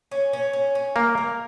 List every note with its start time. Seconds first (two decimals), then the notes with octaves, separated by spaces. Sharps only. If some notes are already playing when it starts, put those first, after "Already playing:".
0.11 C#4
0.33 C#4
0.53 C#4
0.75 C#4
0.96 A#3 A#4
1.18 A#3